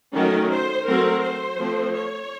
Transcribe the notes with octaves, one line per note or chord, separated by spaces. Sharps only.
D#3 F#3 A3 C#4 A#4
C5
F#3 A3 C4 A#4
C5
F3 A3 C4
C#5